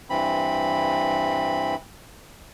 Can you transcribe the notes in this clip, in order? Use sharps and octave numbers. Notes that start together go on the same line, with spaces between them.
G2 E3 C4 B5